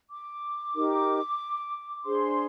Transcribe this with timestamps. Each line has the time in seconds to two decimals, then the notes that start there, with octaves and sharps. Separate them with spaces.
0.10 D6
0.74 D#4 G4 A#4
2.04 D4 G#4 C5 C6